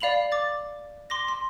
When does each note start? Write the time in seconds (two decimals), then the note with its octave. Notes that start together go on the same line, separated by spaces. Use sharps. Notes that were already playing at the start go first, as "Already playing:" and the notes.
0.01 D5 F5 B5 F7 F#7
0.32 D6 A6
1.10 C6 D6 A#6
1.28 C6